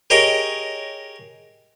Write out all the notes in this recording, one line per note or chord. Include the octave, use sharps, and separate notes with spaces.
G4 G#4 A#4 C#5 D#5